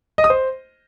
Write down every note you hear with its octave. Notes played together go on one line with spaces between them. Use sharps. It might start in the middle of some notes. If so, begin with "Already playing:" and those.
D#5
D#6
C5